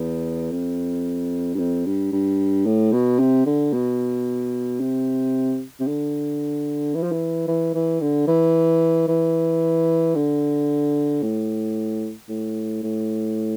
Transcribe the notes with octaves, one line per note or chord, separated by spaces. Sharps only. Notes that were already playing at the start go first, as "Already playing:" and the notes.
Already playing: E2
F2
G2
F2
G2
G2
A2
B2
C3
D3
B2
C3
C3
D3
E3
F3
E3
E3
E3
D3
E3
E3
D3
A2
A2
A2